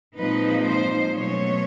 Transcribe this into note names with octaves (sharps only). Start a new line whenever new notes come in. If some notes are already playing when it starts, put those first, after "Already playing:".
A#2 F3 G#3 C4 D#4 B4
C5
B2 F#3 A3 C#4 C#5